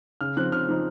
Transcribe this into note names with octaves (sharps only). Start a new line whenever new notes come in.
C#3 F6
F3 C4 D#4 F#6
C#3 F6
F3 C4 D#4